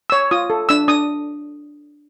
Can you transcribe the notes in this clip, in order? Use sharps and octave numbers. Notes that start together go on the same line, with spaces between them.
C#5 E6
F4 D#6
A4
D4 E6
D4 D#6